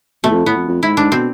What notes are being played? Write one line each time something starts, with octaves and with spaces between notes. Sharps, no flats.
B2 A3
E2
F2
A2 B3
F2
F2
G#2 E4
G#2 D4
B2 C4